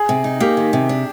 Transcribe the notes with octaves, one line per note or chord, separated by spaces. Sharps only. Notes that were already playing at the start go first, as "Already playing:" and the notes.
Already playing: G#4
C3
D#4
A#3 G4
D#3
C3
D4